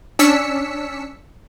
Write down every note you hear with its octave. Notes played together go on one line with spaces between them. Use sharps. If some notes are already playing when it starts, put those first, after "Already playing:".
C#4 D4 E6 B6 C#7